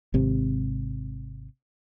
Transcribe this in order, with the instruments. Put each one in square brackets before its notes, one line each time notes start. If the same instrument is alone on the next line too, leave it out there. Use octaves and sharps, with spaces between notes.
[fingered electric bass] G#1 C3